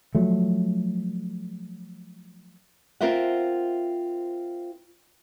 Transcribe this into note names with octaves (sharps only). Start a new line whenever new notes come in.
F3 F#3 A3
C4 F4 A#4 C5 E5 F#5